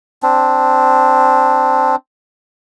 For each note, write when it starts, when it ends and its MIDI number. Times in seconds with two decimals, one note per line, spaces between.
0.23 1.96 60
0.23 1.96 62